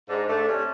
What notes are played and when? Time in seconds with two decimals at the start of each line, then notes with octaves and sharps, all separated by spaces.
0.09 G#2 D4 D5
0.28 A3 D4 D5
0.48 C3 C#4 C#5